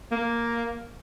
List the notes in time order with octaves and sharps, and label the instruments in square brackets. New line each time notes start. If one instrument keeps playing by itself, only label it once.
[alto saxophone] A#3